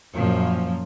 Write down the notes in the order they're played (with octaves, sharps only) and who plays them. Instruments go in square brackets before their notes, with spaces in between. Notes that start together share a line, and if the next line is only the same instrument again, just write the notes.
[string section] F#2 A#2 F3